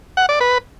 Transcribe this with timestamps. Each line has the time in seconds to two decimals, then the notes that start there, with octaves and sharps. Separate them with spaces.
0.17 F#5
0.29 D5
0.41 B4